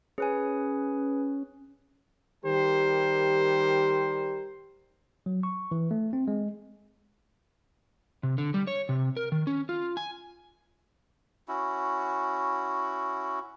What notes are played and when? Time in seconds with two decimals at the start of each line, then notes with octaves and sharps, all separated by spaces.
0.18 C#4 G#4 B4 G#5
2.45 D#3 G3 G4 A#4 C5
5.26 F#3
5.43 C#6
5.71 E3
5.91 A3
6.13 C4
6.28 G#3
8.23 C3
8.38 D3
8.54 G3
8.67 C#5
8.89 C3
9.17 A#4
9.32 D#3
9.47 C#4
9.69 F4
9.97 G#5
11.48 C#4 E4 F#4